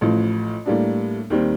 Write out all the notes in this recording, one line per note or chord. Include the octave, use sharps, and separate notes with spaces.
A1 A2 F3
A2 G3 A#3 D4
D#2 D#3 G3 C4